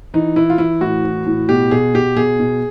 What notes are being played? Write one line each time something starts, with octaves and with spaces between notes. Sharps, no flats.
E3 D#4
E3 E4
F4
E3 E4
A2 F#4
E3
A2
B2 G4
B2 G#4
B2 G4
B2 G#4
B2